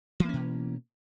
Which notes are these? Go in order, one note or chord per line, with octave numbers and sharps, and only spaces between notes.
B2 E3 A#3 C#4